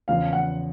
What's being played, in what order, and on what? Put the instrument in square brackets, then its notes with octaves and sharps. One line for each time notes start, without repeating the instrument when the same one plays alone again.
[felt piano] E2 C#3 F3 [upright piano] F5
[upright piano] F#5